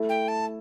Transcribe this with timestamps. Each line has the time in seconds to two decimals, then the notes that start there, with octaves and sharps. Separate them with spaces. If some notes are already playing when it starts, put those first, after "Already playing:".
Already playing: A3 E4 A4
0.09 G5
0.28 A5